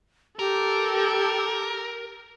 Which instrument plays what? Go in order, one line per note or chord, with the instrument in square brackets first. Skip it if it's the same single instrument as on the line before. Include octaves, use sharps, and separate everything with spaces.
[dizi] G4 [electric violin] A4 [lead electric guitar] A#4